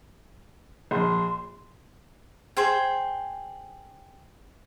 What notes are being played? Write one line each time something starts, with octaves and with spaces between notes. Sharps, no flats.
A#1 C6
G#4 C5 G5